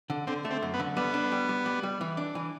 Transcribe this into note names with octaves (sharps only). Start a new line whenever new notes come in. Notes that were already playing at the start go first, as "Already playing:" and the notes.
D3
D3 C4
A3
C4
F#2
B3
D3
G3 B3
D4
G3
G3
G3
G3
E3
D4
E3